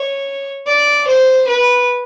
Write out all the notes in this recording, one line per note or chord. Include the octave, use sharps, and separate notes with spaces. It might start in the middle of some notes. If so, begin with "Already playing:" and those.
Already playing: C#5
D5
C5
B4